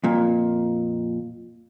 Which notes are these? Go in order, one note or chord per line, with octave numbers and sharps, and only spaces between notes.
F2 A#2